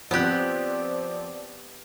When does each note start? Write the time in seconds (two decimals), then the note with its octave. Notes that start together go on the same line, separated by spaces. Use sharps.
0.11 F3 B3 C4 G4 D5 F#6